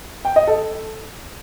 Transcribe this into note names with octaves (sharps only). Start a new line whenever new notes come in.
G5
D#5
A4